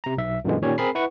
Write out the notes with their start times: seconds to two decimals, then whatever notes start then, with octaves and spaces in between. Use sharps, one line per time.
0.04 C3 A#5
0.17 B1 E5
0.45 F#2 A#2 D3 E3 G#3
0.62 A#2 D#3 C#4 G4 C#5
0.78 C4 G#4 A#4 B5 C7
0.95 E4 B4 F#5 C#6